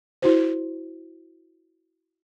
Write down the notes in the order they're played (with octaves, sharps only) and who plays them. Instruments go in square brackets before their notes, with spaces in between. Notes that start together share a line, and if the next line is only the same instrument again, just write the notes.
[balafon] E4 F#4 C5